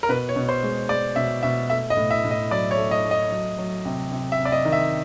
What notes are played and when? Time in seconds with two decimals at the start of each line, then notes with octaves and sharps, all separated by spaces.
0.03 A#4
0.09 B2 B4
0.29 C#5
0.36 B2
0.49 C5
0.63 G#3
0.89 G#3 D5
1.16 B2 E5
1.43 B2 E5
1.70 A3 E5
1.90 D#5
1.97 A2
2.11 E5
2.24 A2
2.31 D#5
2.51 F#3 D5
2.71 C#5
2.77 A3
2.91 D#5
3.05 A3
3.11 D#5
3.31 F#3
3.58 F#3
3.85 C3
4.11 C3
4.32 E5
4.39 C3
4.45 D5
4.52 D#5
4.65 D#3
4.72 E5